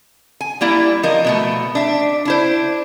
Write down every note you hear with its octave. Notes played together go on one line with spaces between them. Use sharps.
G#5
G3 A#3 E4 D5
F3 A#4 D#5
B2 G#3 A3
D4 E5
D4 E4 C5